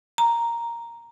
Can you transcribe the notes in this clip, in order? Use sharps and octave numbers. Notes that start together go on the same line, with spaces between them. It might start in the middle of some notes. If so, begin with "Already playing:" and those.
A#5